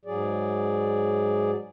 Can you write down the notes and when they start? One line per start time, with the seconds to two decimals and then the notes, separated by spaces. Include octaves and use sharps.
0.05 G#2 F#3 G#4 D5